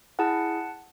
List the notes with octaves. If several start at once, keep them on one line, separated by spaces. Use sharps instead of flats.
E4 G#4 F#5 A5